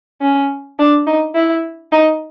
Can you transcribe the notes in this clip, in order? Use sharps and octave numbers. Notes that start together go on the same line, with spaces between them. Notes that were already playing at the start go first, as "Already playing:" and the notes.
C#4
D4
D#4
E4
D#4